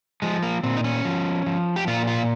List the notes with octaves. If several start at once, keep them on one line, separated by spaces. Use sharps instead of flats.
F3 G#3
A#3
A#2 C4
D#4
C#4
F3
F3
G4
A#2 F4
F4